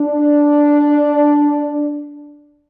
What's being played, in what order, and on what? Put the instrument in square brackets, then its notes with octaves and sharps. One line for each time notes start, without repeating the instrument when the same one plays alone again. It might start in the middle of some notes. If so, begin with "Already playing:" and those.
Already playing: [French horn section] D4